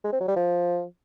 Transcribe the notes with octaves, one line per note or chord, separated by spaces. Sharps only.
G#3
C4
F#3
G3
F3